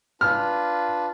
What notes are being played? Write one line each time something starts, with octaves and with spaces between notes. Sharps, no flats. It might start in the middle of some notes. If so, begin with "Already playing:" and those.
D4 F4 B4 F6